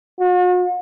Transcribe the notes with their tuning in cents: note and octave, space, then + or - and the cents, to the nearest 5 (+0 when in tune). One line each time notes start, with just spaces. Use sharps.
F#4 -45